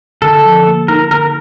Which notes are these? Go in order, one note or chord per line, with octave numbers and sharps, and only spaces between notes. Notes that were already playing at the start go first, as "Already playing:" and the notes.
D3 A4
F3
A#3
D#4 A#4
D3 A#4